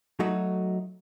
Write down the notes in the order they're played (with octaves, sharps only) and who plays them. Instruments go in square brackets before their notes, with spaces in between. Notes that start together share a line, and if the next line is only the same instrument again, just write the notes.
[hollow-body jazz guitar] F#3 A3 D#4 F#4